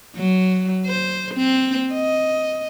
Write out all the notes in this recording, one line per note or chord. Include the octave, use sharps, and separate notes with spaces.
F#3
C5
C4
D#5